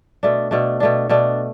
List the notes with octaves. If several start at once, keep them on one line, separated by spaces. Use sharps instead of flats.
B2 A3 D4
B2 A3 D4
B2 A3 D4
B2 A3 D4